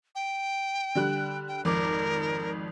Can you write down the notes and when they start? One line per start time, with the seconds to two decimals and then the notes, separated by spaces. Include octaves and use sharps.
0.15 G5
0.95 D3 G3 F#6
1.48 G5
1.65 G#1 F2 A#4 D6